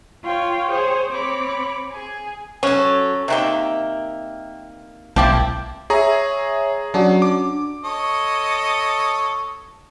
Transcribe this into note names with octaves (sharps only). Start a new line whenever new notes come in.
F4 C#5 F5 G5
G#4 C5 C#5
C4 C#5 B5 D6
G#4 G#5
F#3 C#4 A4
C3 D#3 A#3 E5 F#5 G5
B1 F3 A#3 E4 G4
G#4 C#5 E5 A#5
F#3 C#4 D4 F#4
D6
A4 C#5 D#5